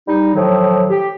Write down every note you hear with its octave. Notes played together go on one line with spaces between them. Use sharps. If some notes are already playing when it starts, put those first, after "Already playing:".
G3 D#4
A2 D#3 F3 F#3
G4